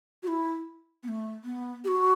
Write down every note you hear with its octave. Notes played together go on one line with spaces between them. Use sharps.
F#4
E4
B3
A3
B3
G4
F#4